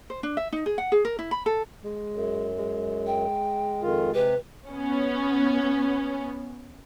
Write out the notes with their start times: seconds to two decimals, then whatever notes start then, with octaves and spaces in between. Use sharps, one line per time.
0.10 C5
0.23 D4
0.37 E5
0.53 D#4
0.66 G#4
0.78 F#5
0.92 G#4
1.05 A#4
1.19 E4
1.31 B5
1.46 A4
1.84 G#3
2.12 F#2
2.58 G#3
3.07 G5
3.82 F2 D#3 F4
4.14 C3 G4 B4
4.69 B3 C#4